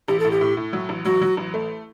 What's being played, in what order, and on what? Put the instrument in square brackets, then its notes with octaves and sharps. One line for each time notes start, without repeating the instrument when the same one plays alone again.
[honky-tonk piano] A1 [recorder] G4
[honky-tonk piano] A2 [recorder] A4
[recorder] G4
[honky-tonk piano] A2
A2
F#3
A1
[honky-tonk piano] F#3 [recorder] F#4
[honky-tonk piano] F#3
A1
A3